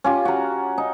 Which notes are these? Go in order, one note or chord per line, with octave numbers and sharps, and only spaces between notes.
C#4 F4 G4
F#4 A#5
D#4